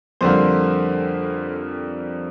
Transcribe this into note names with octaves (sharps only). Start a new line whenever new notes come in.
F2 D3 G3 A#3 C5